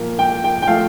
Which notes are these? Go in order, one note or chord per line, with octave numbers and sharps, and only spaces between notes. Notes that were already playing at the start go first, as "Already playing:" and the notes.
Already playing: A#2 F3 A#3
G5
G5
G5
F3 A3 F5